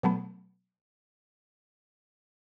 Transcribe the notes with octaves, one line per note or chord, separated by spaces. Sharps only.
B2 F#3 A3 B3